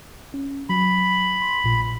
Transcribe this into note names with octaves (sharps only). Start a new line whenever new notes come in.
C#4
F#3 B5
C6
A#1 A#2